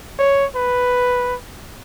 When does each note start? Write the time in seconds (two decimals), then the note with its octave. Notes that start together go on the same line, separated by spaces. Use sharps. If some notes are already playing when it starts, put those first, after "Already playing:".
0.19 C#5
0.56 B4